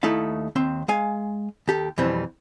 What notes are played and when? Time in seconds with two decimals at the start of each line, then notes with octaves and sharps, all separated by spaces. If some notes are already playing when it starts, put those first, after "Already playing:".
0.03 D#2 A3 D#4 E4 F5
0.56 D#2 C4 C6
0.88 G#3 F5 G#5
1.68 D#2 G4 A4
1.98 F2 B2 E3 G3 C4